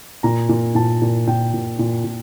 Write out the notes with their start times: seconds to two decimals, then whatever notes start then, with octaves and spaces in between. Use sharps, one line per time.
0.23 A#2 A#5
0.49 A#2
0.75 A#2 A5
1.02 A#2
1.27 A#2 G5
1.54 A#2
1.79 A#2
2.04 A#2